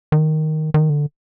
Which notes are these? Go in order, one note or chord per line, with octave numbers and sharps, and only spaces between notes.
D#3
D#3
D3